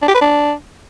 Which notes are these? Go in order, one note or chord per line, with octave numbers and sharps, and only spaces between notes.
D4
G4
B4
D4